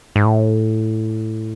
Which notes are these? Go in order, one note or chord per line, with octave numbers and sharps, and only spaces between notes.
G#2
A2